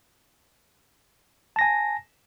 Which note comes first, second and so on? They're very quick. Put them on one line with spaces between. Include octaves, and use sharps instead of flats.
A5 A#6 G#5